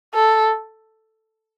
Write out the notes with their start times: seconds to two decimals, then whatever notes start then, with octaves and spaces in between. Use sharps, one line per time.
0.14 A4